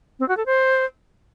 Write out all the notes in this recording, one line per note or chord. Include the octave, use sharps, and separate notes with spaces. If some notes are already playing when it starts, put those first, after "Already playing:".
C4
F#4
A4
C5